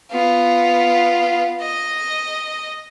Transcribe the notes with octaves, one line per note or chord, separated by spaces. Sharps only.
B3 F4
D#5